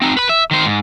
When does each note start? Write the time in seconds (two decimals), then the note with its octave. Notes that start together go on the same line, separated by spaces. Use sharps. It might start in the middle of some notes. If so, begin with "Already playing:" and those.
0.02 C4 D#4
0.17 B4 B5
0.29 E5
0.51 D#3 C5
0.66 G#2